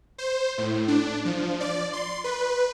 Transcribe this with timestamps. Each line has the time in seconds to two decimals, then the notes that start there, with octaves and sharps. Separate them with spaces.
0.18 C5
0.58 A2
0.88 D4
1.25 F3
1.60 D5
1.93 C6
2.24 B4